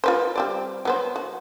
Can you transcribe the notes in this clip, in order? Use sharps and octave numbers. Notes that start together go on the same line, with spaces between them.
F4 B4 C5
G3 C4 D5
F#3 B3 C5
F#4